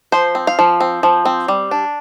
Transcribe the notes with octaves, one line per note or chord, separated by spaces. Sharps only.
F3 C5
C4
F5
F3
C4
F3
C4
G3
D4